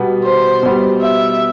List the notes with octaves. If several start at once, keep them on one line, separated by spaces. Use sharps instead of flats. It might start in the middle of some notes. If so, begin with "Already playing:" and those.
Already playing: B2 G3 B3
C5
B2 G3 B3
E5